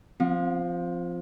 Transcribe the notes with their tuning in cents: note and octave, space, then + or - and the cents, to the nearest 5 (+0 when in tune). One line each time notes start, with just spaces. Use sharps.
F3 +0 C4 +0 F#5 -45